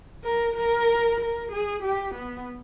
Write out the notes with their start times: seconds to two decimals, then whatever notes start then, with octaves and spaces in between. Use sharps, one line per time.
0.24 A#4
0.56 A#4
1.20 A#4
1.51 G#4
1.82 G4
2.14 B3